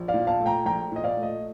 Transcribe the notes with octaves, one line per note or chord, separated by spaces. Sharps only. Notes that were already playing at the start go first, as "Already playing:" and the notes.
Already playing: A#1
D5 F5
A#2
F5 A5
A3
G5 A#5
A#1 G5 A#5
A#2 D#5
D5 F5
A3
D#5